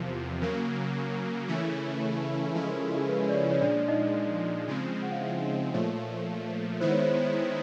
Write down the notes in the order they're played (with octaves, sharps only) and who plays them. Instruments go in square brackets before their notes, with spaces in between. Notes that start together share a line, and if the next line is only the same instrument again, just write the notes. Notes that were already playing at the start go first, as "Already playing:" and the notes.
Already playing: [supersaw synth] E2 C3 F3 [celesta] A#4
[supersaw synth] C#3 F#3 A#3 [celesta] A#4
[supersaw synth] C#3 E3 A3 C#4 E4
[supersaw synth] C#3 F3 G#3 C#4 E4 [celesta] A4
[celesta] A#4
A4
G#4
B4
D5
C#5
C#5
[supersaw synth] A#2 F3 G#3 [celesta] D4 D5
[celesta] D#4 D#5
[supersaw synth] C#3 F3 G#3 C4
[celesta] F#5
F5
E4 E5
D#4 D#5
[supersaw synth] A#2 F3 A3 [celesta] C#5
[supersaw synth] D#3 G#3 B3 E4 [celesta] C5
[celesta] C#5
C5